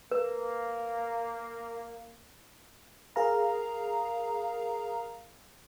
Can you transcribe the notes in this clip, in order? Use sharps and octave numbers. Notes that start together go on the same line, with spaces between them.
A#3 B4
G#4 A#4 F5 A#5